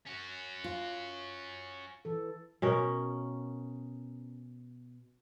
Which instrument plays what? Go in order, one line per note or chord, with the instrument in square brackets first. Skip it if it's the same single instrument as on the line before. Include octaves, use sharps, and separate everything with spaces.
[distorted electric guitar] C#4 F#4
[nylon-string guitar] F4
[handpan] E3 A4
[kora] B2 C#4 A#4